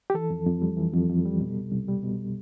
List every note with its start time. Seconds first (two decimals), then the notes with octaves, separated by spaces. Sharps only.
0.10 G4
0.14 E3 A4
0.30 F2
0.46 F2
0.62 G3
0.77 E3
0.94 F2
1.09 F2
1.25 G3
1.41 B2
1.56 C2
1.72 C2
1.88 G3
2.03 B2